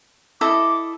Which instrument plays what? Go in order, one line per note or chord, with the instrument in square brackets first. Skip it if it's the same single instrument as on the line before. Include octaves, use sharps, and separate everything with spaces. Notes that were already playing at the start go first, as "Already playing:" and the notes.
[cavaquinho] E4 A4 D#5 [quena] D6